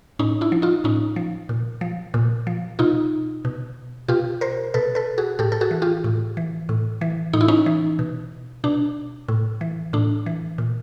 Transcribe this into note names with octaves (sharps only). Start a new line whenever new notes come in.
A2 C#4 D#4
D4 E4
F3
D#4 F4
A2 C#4 D#4
F3
A#2
F3
A#2
F3
B2 D#4 F4
B2
B2 F4 G4
A#4 C5
B2 A4 B4
A4 B4
F#4 G#4
A2 G4 A4
A4
F#4 G#4
E3
F4 G4
A2
E3
A2
E3
A2 D#4
E4
C#4 D#4
E3
B2
B2 D4
A2
E3
A2 D4
E3
A#2